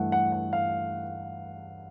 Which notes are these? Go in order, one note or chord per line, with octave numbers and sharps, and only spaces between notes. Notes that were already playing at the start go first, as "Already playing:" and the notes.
Already playing: G2 E3 A3 F#5
F#5
F#5
F5